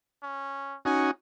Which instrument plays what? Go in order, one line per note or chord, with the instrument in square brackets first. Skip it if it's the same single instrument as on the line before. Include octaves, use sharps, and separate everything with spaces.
[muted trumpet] C#4
[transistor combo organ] C#4 D#4 F#4 [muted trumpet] G#5